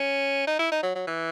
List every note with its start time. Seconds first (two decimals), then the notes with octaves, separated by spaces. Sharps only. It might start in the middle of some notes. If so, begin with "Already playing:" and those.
Already playing: C#4
0.47 D#4
0.59 E4
0.72 D#4
0.83 F#3
0.95 F#3
1.07 E3